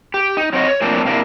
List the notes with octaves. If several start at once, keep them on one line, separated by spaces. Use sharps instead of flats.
G4
D#4
F#3 C4 C#5 D#5
C#5
A2 F3 A#3 C4 D4 A5
C3 A#3 C4 D4 E4